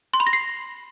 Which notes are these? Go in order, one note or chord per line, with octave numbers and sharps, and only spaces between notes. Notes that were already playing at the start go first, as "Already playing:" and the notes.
C6
B5
A#6
C7